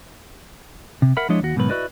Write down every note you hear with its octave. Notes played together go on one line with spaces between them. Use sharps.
C3
A#4 E5 F#5 B5
F3 G#3 D4 E4 C#5 D#5
D#2 F#4
G#2 B2 D#3 F#3 B4
E4 F#4 B4 D5 D#5